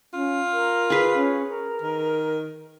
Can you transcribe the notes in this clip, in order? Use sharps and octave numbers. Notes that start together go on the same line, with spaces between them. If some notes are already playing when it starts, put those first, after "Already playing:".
C#4 F4
A#4
G#4 B4
C#4
A#4
D#3